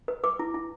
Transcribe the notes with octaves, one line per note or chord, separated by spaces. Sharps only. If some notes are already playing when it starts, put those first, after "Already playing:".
B4
B4 D6
E4
E4